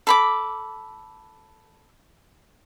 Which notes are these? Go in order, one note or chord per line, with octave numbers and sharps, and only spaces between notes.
A4 B5 D6